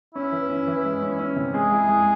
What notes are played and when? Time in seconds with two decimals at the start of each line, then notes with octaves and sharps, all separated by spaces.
0.14 C#4 E4
0.32 E3
0.50 C#4
0.67 E3
0.85 G#3
1.02 C#4
1.19 C#4
1.36 C3
1.54 G#3 G#4
1.71 E4
1.89 G#3